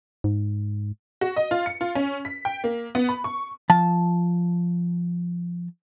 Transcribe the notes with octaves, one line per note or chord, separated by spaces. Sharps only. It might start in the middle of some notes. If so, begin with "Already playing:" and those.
G#2
F#4
D#5
F4
C#7
F4
C#4
B6
G5
A#3
B3
B5
C#6
F3 A5